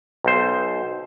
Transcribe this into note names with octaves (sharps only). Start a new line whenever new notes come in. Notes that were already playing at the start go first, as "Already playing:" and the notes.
B1 C5